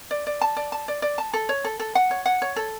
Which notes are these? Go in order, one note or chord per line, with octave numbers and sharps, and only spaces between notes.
D5
D5
A5
D5
A5
D5
D5
A5
A4
C#5
A4
A4
F#5
C#5
F#5
C#5
A4